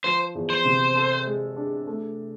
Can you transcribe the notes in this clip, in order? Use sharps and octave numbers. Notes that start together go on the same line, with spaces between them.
F3 C5
E2
C5
C3
A4
G#3
D4
A3